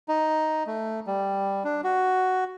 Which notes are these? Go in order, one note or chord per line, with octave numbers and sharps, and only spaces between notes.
D#4
A3
G3
D4
F#4